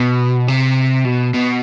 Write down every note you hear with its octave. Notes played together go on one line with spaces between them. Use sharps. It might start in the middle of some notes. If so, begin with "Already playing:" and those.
Already playing: B2
C3
B2
B2